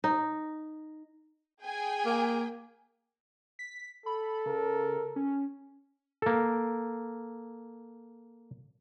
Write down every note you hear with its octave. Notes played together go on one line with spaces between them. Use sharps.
D#4
G#4 G5 G#5
A#3
B6
A4 B5
C#3 A#4
C#4
A#3 A4